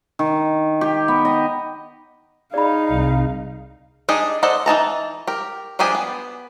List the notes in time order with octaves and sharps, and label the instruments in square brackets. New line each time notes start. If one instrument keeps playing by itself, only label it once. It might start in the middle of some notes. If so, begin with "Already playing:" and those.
[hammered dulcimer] D#3
G4
B3
D#5
[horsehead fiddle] D#4 F5 [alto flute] G#4 [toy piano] D5 B5
[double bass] C2
[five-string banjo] D4 D#4 G4 G#4 D#5
A4 C5 D5 D#5 F#5
E3 D#4 A5 A#5
G4 A#4
F3 D4 G4 G#4 G#5
B3